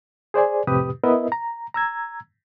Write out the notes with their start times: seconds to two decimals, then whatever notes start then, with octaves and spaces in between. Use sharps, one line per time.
0.34 G#4 C5 D5 G#5
0.67 F2 A2 C3 G4 B4 D#6
1.04 B3 E4 A#4 B4 D#5 E5
1.32 A#5
1.74 A#5 E6 G#6